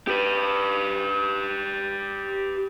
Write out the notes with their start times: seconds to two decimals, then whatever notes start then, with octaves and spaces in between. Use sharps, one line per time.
0.07 G4 B4